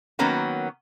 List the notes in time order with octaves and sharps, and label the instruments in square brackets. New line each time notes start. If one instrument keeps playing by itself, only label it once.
[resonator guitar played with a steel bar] D#3 F#3 A#3 B3 C#4 F#4